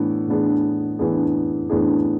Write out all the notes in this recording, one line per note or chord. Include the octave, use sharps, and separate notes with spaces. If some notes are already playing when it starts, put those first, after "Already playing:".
Already playing: A2 E3 B3 D4
A2 E3 B3 D4 G#4
A2 E3 B3 D4 G#4
A2 E3 B3 D4 G#4